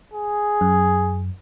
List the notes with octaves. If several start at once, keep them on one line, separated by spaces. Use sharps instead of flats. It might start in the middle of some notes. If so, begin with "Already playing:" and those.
G#4
F#2